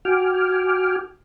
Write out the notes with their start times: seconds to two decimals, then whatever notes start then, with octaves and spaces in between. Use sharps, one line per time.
0.05 F#4 G5 G#5 D6 F6